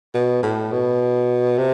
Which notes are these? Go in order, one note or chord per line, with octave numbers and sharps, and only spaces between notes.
B2
A2
B2
C3